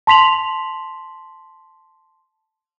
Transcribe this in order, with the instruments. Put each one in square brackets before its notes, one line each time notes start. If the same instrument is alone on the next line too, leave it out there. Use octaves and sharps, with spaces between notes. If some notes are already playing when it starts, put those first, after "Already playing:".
[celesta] A5 C6 B6 F7 F#7